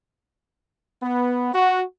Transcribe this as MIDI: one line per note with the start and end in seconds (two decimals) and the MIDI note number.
1.03 1.54 59
1.54 1.83 66